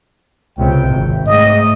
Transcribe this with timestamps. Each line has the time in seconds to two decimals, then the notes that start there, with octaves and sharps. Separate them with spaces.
0.58 C#2 C3 G5
0.90 G#1
1.27 G#2 A3 D#5